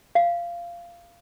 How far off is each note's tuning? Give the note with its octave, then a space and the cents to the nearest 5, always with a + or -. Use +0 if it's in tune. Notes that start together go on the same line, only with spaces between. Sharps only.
F5 -15